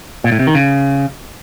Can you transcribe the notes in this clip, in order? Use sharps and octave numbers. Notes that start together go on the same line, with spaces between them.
A#2
A2
C3
D#3
C#3